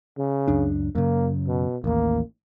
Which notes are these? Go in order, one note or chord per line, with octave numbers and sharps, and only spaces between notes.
C#3
C#2 F#2 D4
F#2 C#3 A#3
B2
A1 D#2 A#3